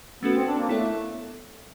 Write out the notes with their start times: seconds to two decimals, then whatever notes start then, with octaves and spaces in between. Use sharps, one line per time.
0.23 A3 B3 C#4 F#4 A4
0.34 C4
0.46 D4
0.57 A#3
0.69 A3 B3 E4 A4 C#5